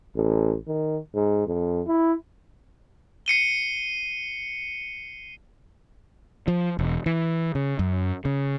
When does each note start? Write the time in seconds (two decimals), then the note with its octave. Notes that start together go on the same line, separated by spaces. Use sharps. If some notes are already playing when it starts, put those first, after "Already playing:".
0.15 A1
0.67 D#3
1.14 G#2
1.47 F2
1.87 E4
3.26 C7 C#7 D#7 G7
6.48 F3
6.79 E1
7.06 E3
7.55 C#3
7.79 F#2
8.25 C#3